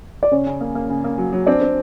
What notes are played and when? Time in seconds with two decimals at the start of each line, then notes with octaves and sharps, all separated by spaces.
0.23 D5
0.31 C#3 C#4 C#5
0.46 C#3
0.61 A#3
0.75 A#3
0.89 C#3
1.04 A#3
1.18 F#3
1.33 F#3
1.46 C4 D4 D5
1.61 C4